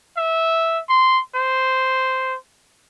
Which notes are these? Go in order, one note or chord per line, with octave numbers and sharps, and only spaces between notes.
E5
C6
C5